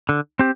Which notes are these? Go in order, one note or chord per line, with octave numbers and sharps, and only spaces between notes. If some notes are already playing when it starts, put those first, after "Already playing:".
D3
C4 G4